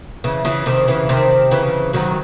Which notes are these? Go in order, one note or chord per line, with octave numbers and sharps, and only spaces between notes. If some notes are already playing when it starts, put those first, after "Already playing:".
C#3 E3
C#3 E3
C3 D#3
C#3 E3
C3 D#3
C#3 E3
D#3 F#3